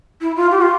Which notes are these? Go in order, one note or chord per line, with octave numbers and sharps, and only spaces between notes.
E4
F4
G4
F4